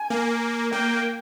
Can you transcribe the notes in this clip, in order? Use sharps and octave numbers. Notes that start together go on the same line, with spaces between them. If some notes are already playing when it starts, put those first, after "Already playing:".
Already playing: G#5
A#3
A#3 G5